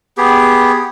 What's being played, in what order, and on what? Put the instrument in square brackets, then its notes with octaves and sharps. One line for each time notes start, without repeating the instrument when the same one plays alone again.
[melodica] B3 G4 G#4